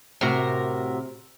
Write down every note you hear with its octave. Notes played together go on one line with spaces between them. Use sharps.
A2 C3 F#4 A#4 A#5